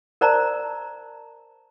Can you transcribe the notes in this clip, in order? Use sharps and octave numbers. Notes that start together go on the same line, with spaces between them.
A#4 C5 D5 A5 A#5